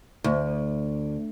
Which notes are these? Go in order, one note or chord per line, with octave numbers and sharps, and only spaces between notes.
D2